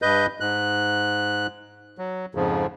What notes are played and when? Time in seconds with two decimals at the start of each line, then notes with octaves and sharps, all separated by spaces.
0.02 G2 B4 D#5 G6
0.40 G#2 F#6
1.98 F#3
2.35 F2 G#2 C#3 F3